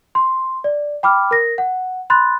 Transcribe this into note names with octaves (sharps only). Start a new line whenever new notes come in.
C6
D5
G5 B5 D6 F6
A#4 A#6
F#5
B5 C6 F#6 A6